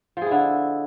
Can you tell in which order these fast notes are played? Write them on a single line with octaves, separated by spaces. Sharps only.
F3 G#4 E4 D3